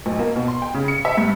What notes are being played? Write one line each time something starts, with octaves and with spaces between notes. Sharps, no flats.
B1
A#3
B2
C6
G5
C#3
C#7
E5
G2